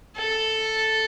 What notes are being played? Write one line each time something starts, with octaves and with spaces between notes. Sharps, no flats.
A4